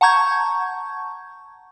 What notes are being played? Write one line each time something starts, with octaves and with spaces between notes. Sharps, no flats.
F#5 A5 A#5 C#6 G6 G#6